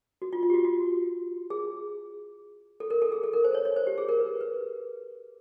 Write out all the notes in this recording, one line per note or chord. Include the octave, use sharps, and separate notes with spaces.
F#4
F4
F4
G4
F#4
F#4
G#4
A4
A#4
A4
G#4
A4
A#4
C5
C#5
C#5
C5
G4
G#4
A#4
B4
B4